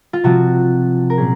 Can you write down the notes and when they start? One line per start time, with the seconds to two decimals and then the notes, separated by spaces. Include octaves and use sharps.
0.13 F4
0.24 C3 F3 C4 F#4
1.10 A#4
1.17 A#2 F#3 C#4 G#4